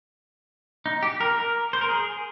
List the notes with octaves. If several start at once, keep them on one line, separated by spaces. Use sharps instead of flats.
D#4
G4
A#4
A#4
C5
A#4
G#4